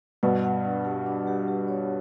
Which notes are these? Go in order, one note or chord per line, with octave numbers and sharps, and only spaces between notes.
G2 B2 F#5
F#5
D4
G4
D4
G4
G4
C#5